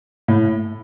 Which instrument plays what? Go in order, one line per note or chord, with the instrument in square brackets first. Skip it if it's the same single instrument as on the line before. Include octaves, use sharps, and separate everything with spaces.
[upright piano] A2